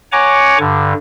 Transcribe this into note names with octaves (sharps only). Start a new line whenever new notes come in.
C#5 F#5 G#5 A#5 C#6 D6
G2 D3